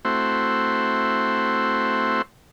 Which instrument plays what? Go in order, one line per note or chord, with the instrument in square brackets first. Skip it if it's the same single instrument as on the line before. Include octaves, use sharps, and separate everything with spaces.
[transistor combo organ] A3 C4 E4 F#4 C5